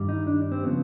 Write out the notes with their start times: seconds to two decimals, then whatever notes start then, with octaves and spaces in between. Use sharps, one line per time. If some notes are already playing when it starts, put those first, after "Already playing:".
Already playing: G2 D#3 G3
0.09 D#4
0.27 D4
0.52 C4
0.63 C#3 F3 B3